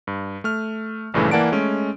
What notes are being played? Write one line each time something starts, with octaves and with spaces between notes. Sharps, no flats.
G2
A3 F6
A#1 G2 C#3 E3 A3
E3 A#3 D5 F#5 A5 D7
G#3 A3 C#4